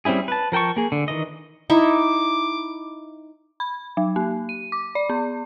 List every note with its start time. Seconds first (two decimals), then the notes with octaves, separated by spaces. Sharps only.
0.05 G3 C4 C#4 E4 G#4
0.28 B4 A5
0.52 F3 A#4 G5 A5 C#6
0.77 A#3 G#4
0.92 D3
1.08 D#3 E3 D#5
1.70 D#4 E4 E5 D6
3.60 B5
3.97 F#3
4.16 A#3
4.49 D#7
4.72 D6
4.95 D5
5.10 B3